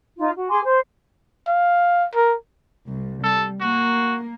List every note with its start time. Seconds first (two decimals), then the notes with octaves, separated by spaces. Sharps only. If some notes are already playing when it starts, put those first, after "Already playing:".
0.18 D#4 F4
0.35 F#4
0.49 G#4 G#5 C6 D6
0.63 C5
1.47 F5
2.15 A#4
2.87 C2
3.24 G3 A4
3.61 A#3 F#4